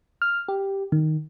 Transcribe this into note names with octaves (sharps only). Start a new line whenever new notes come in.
F6
G4
D#3